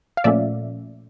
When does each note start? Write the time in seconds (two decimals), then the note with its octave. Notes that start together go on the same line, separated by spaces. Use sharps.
0.17 F5
0.24 A#2 F3 A3 C#4 D5 E5